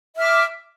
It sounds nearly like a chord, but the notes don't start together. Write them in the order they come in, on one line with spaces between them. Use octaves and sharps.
E5 F6 D6